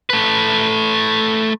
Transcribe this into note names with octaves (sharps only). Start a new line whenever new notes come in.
A3 B4